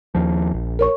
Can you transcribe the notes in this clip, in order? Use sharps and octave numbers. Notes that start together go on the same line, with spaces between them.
D#2 F3
A#1
A#4 C#5 C#6